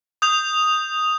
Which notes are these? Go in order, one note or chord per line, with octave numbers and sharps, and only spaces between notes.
D#6 G6 F7